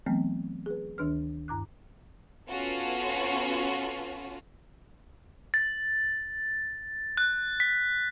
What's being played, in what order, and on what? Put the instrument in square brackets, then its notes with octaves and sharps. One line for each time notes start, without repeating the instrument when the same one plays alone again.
[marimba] E3 F#3 A3 B3 C4
G#4 B4
D2 D#3 D4 B4 F6
G2 A#5 D6 F#6
[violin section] B3 C#4 F4 F#4 A4
[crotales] A6
F#6
B6